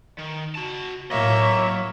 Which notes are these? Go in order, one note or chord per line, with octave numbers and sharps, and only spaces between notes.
D#3
F#4 A5
A2 F#3 A#3 C#5 D#5 E5